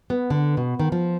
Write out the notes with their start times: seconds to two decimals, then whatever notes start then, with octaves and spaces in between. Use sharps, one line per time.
0.10 B3
0.30 D3
0.57 B2
0.79 D#3
0.92 F3